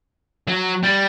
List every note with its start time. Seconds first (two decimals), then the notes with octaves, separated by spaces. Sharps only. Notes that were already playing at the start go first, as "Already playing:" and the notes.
0.48 F#3
0.83 G3